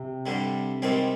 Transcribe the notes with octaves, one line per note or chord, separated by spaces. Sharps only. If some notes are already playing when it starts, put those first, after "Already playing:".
Already playing: C3
G2 D3 G3
G#2 D#3 G3 C4